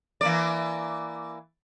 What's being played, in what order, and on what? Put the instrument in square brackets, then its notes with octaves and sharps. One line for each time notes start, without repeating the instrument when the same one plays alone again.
[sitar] E3 A#3 D5